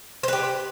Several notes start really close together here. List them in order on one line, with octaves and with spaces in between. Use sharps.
C5 B4 G4